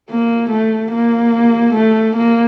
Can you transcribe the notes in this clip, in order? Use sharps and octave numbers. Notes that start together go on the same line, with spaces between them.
A#3
A3
A#3
A3
A#3